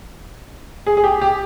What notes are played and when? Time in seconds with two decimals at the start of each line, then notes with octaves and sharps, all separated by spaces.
0.86 G#4
0.97 G#4
1.04 G4
1.22 G4